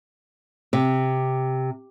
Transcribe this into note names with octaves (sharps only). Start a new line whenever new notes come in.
C3